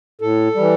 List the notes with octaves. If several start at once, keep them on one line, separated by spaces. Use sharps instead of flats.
A2 A4
E3 G3